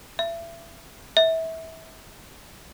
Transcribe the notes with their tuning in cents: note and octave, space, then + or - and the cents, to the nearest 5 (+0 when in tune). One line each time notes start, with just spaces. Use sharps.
E5 +30
E5 -25